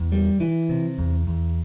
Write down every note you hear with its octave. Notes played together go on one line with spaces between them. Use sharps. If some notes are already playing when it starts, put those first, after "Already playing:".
Already playing: E2
G3
E3
C3
E2
E2